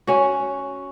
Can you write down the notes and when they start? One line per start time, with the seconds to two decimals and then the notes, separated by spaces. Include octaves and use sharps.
0.07 C#4 F#4